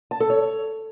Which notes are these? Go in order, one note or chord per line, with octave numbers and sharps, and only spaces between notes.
A5
A4
C#5